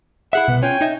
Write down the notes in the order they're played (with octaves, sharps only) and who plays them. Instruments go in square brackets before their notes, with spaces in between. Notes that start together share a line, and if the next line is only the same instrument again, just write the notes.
[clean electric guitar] E4 G#4 E5 [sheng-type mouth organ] F#5
[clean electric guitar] C2 B4 [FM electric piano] B2
[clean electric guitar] C#4 F4 [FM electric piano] C#5 [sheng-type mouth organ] G5 G#5
[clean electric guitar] D#4 D#5 E5